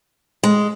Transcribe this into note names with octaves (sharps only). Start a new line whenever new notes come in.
G#3